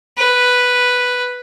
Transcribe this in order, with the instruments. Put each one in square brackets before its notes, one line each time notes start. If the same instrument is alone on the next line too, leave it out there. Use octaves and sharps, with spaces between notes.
[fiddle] B4